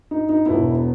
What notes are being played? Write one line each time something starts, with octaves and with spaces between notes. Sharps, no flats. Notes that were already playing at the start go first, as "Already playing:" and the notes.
D#4
D#4
E1 E2 B2 E4